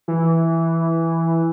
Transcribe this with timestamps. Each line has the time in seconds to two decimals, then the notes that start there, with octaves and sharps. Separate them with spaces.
0.08 E3